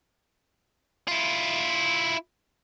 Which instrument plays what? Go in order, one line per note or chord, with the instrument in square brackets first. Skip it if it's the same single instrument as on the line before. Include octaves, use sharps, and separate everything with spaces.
[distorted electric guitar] E4 F4